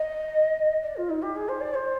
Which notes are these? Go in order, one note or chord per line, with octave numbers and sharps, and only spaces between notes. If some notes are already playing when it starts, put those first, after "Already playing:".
Already playing: D#5
D5
F4
D#4
G4
G#4
C5
D5
C5